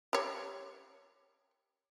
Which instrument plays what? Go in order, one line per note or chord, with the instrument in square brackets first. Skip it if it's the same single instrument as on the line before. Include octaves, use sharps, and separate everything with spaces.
[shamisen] G4 C#5